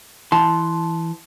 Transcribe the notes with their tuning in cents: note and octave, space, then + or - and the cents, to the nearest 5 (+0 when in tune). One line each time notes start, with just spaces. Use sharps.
E3 +0 A5 -10 C6 +0